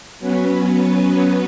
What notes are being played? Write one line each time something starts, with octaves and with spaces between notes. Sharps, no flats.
F#3 B3 C#4 B4